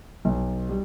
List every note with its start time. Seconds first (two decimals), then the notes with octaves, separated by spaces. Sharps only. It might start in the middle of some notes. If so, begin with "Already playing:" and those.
0.25 B1
0.69 G3